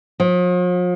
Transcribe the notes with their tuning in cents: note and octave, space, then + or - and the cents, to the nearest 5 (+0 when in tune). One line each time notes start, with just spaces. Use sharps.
F3 +45